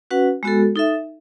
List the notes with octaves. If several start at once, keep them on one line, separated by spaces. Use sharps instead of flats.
C#4 F#4 B4 F#5
G#3 B3 F#4 A4
D#4 A4 E5